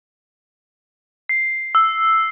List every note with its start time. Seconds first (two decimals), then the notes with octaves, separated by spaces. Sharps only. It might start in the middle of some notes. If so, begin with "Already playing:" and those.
1.29 C7
1.75 E6